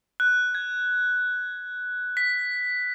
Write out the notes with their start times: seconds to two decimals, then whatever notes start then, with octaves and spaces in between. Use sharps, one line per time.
0.20 F#6
0.55 G#6
2.17 B6